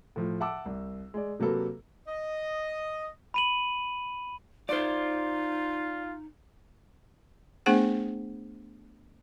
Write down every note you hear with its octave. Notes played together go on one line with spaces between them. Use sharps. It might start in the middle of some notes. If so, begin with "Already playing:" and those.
A2 F3
E5 F#5 A5 D6 E6
C2
G#3 D5
C3 F#3 A#3 A4 B4
D#5
B5 D#7 F#7
D#4 F4 C5 D5
A3 B3 D4 G#4 C5 F#5